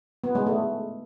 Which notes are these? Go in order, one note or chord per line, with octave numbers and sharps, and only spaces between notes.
B3
G#3
A3